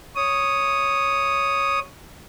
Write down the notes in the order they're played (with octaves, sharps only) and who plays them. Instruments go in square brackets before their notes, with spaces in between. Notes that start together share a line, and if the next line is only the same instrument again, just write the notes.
[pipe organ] C#5 D#6